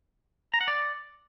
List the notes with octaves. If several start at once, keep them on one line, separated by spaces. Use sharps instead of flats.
A#5
F#5
D5